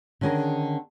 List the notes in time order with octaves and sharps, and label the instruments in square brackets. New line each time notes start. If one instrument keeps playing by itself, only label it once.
[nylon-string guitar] D3 D#3 C#4 G#4 A#4